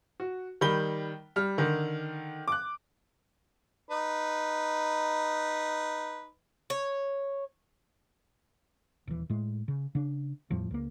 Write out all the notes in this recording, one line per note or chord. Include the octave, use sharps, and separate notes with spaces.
F#4
D#3 G3 B5 G7
G3 F6
D3 D#3
D6 F#6
D#4 B4
C#5
D#1 E3
A2 G#3
C#3
C#3 D4
E2 A2 F3 G3
C#2 A#3